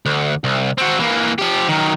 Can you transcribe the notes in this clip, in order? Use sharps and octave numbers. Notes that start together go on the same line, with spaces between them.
D2
C2
C4 F#4
E3 A#3
F3 G4
D#3 F#3